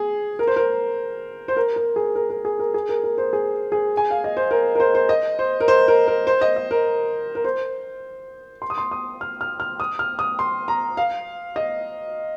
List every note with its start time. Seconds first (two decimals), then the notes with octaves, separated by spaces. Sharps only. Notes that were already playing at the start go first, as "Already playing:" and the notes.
Already playing: G#4
0.39 A#4
0.47 C5
0.56 A#4
1.48 C5
1.57 A#4
1.76 A#4
1.96 G#4
2.15 A#4
2.30 A#4
2.45 G#4
2.59 A#4
2.74 G#4
2.89 A#4
3.04 A#4
3.18 C5
3.33 G#4
3.72 G#4
3.97 G#5
4.10 F5
4.24 D#5
4.37 C5
4.51 A#4
4.75 A#4
4.80 C5
4.95 C5
5.09 D#5
5.39 C5
5.60 A#4
5.68 C5
5.88 A#4
6.08 A#4
6.27 C5
6.41 D#5
6.56 D#5
6.71 A#4
7.35 A#4
7.44 C5
8.62 C6
8.70 D#6
8.78 C6
8.91 D#6
9.21 F6
9.41 F6
9.60 F6
9.80 D#6
9.99 F6
10.19 D#6
10.39 C6
10.68 A#5
10.97 F5
11.56 D#5